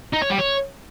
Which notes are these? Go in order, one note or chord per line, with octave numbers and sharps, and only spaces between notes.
D#4
C#5
G3
C#5